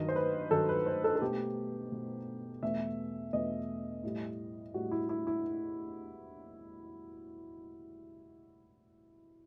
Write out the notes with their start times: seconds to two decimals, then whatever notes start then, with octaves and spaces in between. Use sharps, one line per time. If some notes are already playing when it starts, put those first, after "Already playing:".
Already playing: G2 D#3 F#3 D#5
0.09 C5
0.16 B4
0.51 G2 D#3 F#3 A4
0.69 B4
0.86 C5
1.04 A4
1.16 A4
1.21 B2 A3 G4
1.92 B2 A3
2.62 E2 B2 A3 E5
3.33 E2 B2 A3 D#5
4.04 A2 G3
4.74 A2 G3 F#4
4.91 E4
5.09 E4
5.27 E4